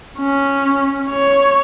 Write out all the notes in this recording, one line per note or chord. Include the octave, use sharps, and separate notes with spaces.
C#4
C#5